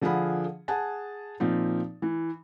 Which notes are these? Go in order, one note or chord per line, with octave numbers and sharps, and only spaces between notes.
D3 F3 G#4 F5 F#5 B5
G#4 F#5 G#5 A5
A#2 F3 C4 D#4
E3